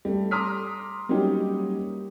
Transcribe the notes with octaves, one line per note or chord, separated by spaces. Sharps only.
G3 A3
A#5 C6 D6 D#6 F6 B6
F#3 G3 A#3 C#4 D#4 G4